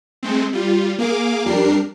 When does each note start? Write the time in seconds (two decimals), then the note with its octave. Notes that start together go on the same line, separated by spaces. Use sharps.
0.23 G#3 A3 C4
0.53 G3 F4
0.99 A#3 G#4 F5 D6
1.46 F2 G3 D4 A#4 C7